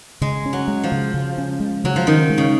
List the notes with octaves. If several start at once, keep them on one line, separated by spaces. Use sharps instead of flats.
C#3 G#3
C#4
F#3
G#3
F3
C#3
C#3
C#4
G#3
C#3 F#3
F3
D#3 C#4
G#3
C#3